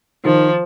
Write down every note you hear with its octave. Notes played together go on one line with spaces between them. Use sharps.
D#3 F3